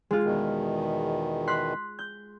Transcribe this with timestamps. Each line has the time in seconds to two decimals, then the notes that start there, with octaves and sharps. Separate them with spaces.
0.11 G#3 F4
0.23 E2 B2 D#3
1.47 C6 F#6 B6
1.99 G6